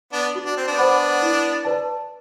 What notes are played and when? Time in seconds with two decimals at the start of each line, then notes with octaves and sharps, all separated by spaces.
0.13 B3 D4
0.35 F#4
0.46 D4
0.57 C4
0.67 B3 D4
0.78 C5 F#5 B5 D6
1.22 E4
1.65 B4 D5 A5